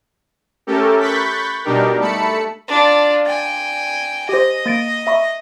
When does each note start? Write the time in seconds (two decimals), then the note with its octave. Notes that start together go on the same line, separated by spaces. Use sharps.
0.67 A3 C#4 G4 A4 A#4
1.00 B5 C#6 F#6 G6 A6 B6
1.64 B2 G3 D4 D#4 G4 A#4
2.00 A3 A5 B5 C#7
2.68 D4 F4
3.26 G5 G#5 A6
4.29 G4 C5 D#5
4.66 A#3 A6 D7
5.07 E5 B5 C#6